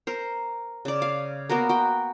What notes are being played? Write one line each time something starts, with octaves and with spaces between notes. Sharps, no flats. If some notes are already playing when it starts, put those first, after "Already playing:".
A#4 C5
C#3 D5
F5
A#3 B3 F#4 A#4
F#4 G5